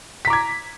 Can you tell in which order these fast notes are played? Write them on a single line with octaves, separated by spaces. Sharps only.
B6 A#5 D6 G#6